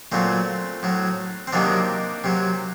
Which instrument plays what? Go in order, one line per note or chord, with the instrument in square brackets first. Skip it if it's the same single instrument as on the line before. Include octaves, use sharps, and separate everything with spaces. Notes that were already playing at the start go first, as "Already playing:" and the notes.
[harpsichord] A#2 F#3 A3 C4
A2 F#3
C4
C3 D#3 F#3 A#3 D4
C3 F#3